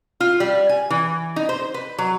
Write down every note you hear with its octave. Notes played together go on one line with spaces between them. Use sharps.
F4
G3
G#5
E3
D#4
C5
B4
F#3